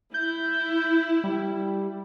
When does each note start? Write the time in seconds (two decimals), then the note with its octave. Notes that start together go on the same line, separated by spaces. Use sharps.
0.14 E4 G6
1.24 G3